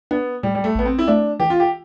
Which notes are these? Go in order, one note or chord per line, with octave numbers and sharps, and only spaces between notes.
B3 D4
A2 G3
G3
A3
A1 B3
C4
E4
A3 D4
E3 G4
F4
G4